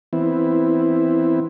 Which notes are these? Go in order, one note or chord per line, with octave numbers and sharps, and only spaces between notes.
E3 B3 C4 E4